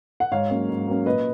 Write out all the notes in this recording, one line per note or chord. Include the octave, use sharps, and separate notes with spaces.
F#5
G#2 C#5 F5
F#3 A#3 C#4
G#2
F#3 A#3 C#4
A#2 B4 D#5